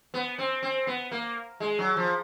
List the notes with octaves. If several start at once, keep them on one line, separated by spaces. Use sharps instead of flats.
B3
C4
C4
B3
A#3
G#3
F#3
F3